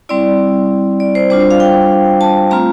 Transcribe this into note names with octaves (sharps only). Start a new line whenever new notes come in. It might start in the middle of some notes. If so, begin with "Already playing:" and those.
G3 C4 E4 D5
D5
C5
G3 D4 F4 C5
C5
F5
G5
A5
A3 C4 F4 A#5